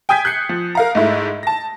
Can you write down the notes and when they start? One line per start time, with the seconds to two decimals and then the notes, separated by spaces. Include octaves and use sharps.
0.09 G5 G#5 D#6 G6 G#6 B6
0.25 F#6 G6 C7 C#7
0.49 F3
0.75 A#4 F5 A#5
0.95 G#2 A3 E4
1.43 A5 A#6